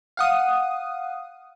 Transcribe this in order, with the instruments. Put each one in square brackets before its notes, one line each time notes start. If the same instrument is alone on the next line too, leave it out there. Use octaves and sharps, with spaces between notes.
[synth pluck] F5 F#5 D#6